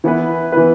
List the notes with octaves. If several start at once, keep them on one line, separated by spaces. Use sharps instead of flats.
E3 B3 E4 B4
E3 B3 E4 B4